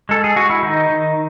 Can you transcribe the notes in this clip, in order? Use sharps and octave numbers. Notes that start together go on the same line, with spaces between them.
G#3 A4
G#4
G#3 F#4
E4
D#3 D#4
D#3